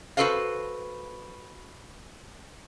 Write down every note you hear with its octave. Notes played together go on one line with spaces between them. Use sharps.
F#4 G4 A4 B4 C5 F5